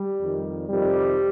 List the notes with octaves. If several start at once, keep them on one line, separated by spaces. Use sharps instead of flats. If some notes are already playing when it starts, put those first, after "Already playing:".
Already playing: G3
F2 D#3
F2 C3 D#3 G3